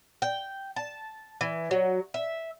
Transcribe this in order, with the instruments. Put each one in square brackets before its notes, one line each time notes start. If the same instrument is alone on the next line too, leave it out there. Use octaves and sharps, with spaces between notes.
[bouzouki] G5
A5
E3
F#3
E5